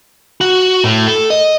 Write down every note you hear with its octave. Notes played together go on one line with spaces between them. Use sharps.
F#4
A2
A4
D#5